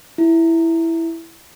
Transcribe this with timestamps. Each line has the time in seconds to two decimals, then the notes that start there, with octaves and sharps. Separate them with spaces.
0.18 E4